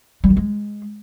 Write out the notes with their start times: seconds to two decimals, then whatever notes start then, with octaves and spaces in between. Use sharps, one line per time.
0.24 G3
0.30 D#3
0.37 G#3